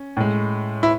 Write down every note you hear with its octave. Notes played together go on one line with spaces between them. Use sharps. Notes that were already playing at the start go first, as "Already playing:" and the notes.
Already playing: C#4
A2 G#3
E4